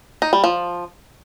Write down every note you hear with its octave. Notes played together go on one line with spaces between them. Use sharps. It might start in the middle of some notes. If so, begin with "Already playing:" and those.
D#4
G3
F3